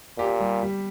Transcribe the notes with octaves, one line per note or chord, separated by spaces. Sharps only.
A#2 G4
G3
G3